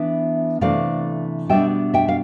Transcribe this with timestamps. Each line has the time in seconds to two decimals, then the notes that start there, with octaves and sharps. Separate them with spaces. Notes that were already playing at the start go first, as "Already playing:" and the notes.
Already playing: E3 B3 D4 E5
0.61 C3 E3 A3 D4 D5 F5
1.49 B2 G3 B3 D4 E5 G5
1.94 E5 G5
2.08 F5